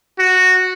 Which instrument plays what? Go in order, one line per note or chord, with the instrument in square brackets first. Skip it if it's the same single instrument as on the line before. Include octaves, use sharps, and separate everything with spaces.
[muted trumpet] F#4